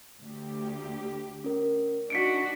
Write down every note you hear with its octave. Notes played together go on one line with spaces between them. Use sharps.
D2 G4
C#4 A#4
D4 D#4 F#4 B6 C#7 D7